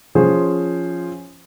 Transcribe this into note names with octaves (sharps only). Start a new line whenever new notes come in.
F3 C#4 G#4 C5